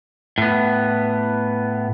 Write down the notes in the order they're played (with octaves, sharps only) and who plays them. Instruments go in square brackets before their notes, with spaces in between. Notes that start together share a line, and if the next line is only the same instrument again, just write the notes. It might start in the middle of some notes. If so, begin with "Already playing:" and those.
[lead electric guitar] A2 B3